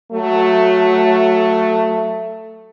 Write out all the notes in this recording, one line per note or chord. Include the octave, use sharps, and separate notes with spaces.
F#3 A3